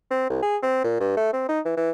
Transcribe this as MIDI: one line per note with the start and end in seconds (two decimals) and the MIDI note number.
0.11 0.27 60
0.30 0.39 36
0.42 0.57 68
0.63 0.79 60
0.84 0.99 46
1.00 1.14 43
1.17 1.32 57
1.33 1.47 60
1.49 1.60 63
1.65 1.77 52
1.77 1.91 52